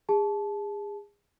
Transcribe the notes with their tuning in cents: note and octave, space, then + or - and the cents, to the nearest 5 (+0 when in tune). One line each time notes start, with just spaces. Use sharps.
G#4 -30 A5 -20